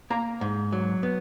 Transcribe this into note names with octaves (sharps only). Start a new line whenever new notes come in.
A#3 A#5
G#2
F#3
B3